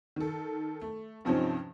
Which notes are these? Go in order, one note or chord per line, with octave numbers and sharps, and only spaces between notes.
D#3 A4
A3
G2 C3 F3 C4 C#4 D#4